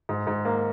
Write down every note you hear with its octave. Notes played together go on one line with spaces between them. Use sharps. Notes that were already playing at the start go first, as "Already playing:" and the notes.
G#2
G#2
A#3